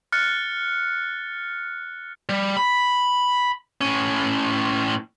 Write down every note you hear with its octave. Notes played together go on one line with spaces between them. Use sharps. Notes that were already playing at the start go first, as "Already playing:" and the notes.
F6 F#6 A6 C#7
G3
B5
A2 C#4